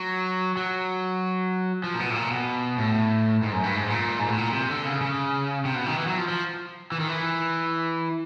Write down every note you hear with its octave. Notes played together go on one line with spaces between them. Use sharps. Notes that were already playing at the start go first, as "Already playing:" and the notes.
Already playing: F#3
F#3
F3
A#2
B2
A2
A#2
B2
A2
G#2
F#2
G2
G#2
A#2
G#2
A2
A#2
C3
D3
C#3
C#3
C3
B2
D#3
E3
F#3
F3
F3
E3
D#3
E3